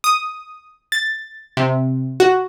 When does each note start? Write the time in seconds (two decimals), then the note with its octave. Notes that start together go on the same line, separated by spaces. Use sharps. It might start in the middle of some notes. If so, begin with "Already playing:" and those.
0.04 D#6
0.92 A6
1.57 C3
2.20 F#4